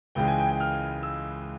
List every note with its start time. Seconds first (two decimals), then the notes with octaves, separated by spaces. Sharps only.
0.15 C#2 C#3 E3 G#3 G5
0.27 G#5
0.38 G5
0.49 G5
0.60 F6
1.03 E6